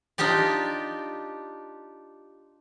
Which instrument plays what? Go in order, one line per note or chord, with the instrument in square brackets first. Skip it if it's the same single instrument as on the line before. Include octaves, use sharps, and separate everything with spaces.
[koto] D4 D#4 F4 G4 D5